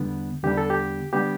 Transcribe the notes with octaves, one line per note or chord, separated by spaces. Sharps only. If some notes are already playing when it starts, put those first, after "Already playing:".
Already playing: E2 D3 G3 B3 D4
E2 D3 G3 B3 D4 G4
A4
G4
D3 G3 B3 D4 G4